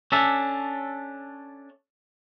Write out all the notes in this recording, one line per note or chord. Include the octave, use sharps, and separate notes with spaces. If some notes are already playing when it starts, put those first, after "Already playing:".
C#4 D4 A4 E5